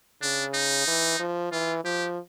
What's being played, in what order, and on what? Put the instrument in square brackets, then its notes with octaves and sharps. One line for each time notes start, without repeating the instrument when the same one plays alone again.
[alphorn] C#3 [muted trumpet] D4
[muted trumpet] D#4
[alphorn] E3
F3
[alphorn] E3 [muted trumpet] F4
[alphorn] F3 [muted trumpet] G4